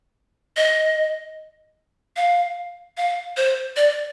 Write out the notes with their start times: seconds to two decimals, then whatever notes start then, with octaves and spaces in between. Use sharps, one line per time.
0.57 D#5
2.16 F5
2.97 F5
3.37 C5
3.76 D5